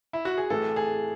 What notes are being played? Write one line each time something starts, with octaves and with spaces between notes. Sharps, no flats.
E4
F#4
G#4
A2 E3 A3 A4
G#4